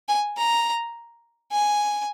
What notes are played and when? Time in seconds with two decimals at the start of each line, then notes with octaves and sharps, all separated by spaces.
0.08 G#5
0.37 A#5
1.52 G#5